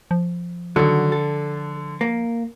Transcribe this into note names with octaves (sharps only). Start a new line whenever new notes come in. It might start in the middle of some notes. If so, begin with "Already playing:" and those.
F3
D3 D#3 F#3
A4
A#3